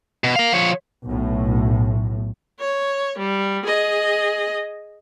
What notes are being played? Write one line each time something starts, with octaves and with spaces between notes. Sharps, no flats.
B2
A#4 F5
F3 C#5
B1 A2
C#5
G3
G#4 D#5